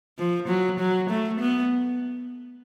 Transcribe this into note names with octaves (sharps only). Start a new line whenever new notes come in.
F3
F#3
F#3
A3
B3